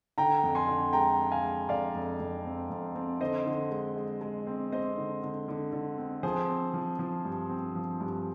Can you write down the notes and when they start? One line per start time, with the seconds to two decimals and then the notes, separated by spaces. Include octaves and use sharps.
0.18 D3 G5 A#5
0.43 F2
0.55 G#5 C6
0.68 D3
0.93 G#3 G5 A#5
1.19 G#3
1.32 F5 G#5
1.43 G#3
1.69 F2 D5 F5
1.95 F2
2.20 F2
2.45 C4
2.70 F2
2.95 C4
3.20 D3 C5 D#5
3.46 D3
3.71 G#3
3.96 G#3
4.21 G#3
4.47 C4
4.72 C4 C5 D#5
4.98 D3
5.23 D3
5.48 D3
5.72 D3
5.98 C4
6.23 F3 G#4 C5
6.49 C4
6.74 F3
6.99 F3
7.25 G2
7.49 C4
7.75 F3
8.00 G2